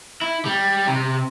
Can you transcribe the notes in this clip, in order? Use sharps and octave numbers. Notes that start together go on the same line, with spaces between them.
E4
G3
C3